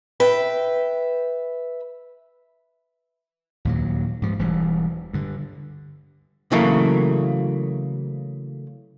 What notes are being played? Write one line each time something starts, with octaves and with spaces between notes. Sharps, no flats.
B4 E5 G5
D#2 A#2 F#3
G#2 F3
E1 E3 G3
G2 D3
C#3 E3 F#3 A3 A#3